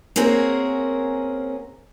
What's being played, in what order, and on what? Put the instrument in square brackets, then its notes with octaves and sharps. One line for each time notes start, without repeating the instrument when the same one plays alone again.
[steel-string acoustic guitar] A#3 C4 C#4 F#4 G#4 A#4